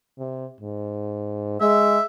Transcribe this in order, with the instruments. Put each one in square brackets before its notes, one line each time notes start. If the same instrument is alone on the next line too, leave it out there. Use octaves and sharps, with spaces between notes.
[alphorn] C3
G#2
[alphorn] G#3 [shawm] E5